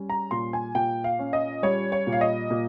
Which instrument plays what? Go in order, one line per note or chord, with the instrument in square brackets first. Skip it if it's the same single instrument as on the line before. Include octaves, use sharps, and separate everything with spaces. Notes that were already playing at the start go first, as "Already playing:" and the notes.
Already playing: [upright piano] G3 C#4
A#5
A#2 C6
G#5
A#2 G5
F5
C#4
D#5
G3 C#5
C#5
A#2
F5
D#5
A#2